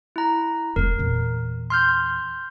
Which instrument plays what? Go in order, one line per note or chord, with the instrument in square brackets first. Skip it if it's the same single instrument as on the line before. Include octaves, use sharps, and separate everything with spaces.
[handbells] E4 A#5
[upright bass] F1 A3 [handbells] A#4
[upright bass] E2 A#2
[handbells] C6 F6 G6